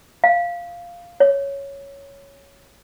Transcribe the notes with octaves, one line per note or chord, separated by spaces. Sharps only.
F5
C#5